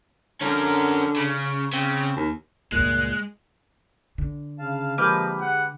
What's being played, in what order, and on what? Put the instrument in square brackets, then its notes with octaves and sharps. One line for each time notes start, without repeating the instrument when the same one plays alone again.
[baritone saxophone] D3 [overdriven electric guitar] C#4 A#4
[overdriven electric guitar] C#3
[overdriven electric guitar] C#3 [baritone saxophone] C4
[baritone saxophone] D#2
[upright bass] C#2 G2 [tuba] A#2 [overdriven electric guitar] G#3 [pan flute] F#6
[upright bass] D3
[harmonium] C#3 F5 A5
[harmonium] F3 G#3 A#3 [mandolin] G4 B4 F6 [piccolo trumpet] D#5
[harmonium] G#3 [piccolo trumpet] F#5